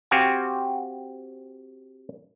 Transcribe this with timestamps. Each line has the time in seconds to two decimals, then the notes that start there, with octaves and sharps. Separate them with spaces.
0.11 C4 F#4 G4 F5 G#5